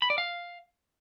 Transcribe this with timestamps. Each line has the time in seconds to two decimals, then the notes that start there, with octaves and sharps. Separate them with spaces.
0.02 B5
0.10 D5
0.18 F5